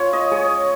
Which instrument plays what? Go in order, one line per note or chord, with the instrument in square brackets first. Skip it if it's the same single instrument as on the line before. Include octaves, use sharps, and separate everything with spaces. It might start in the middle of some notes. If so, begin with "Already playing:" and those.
Already playing: [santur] C#4 F4 C#5
D#5
G#3 C#5